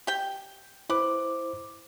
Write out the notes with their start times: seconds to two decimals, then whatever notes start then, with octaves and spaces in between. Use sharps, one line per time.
0.07 G4 G5
0.90 E4 B4 C5 D6